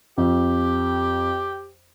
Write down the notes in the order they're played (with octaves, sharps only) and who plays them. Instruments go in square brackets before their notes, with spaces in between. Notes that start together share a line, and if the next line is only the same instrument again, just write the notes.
[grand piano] F2 [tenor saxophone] G4